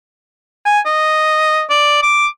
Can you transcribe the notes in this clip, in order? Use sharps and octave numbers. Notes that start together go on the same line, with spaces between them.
G#5
D#5
D5
D6